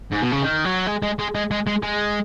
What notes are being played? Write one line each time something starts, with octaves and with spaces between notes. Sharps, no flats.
G#2
B2
C#3
D#3
F#3
G#3
G#3
G#3
G#3
G#3
G#3
G#3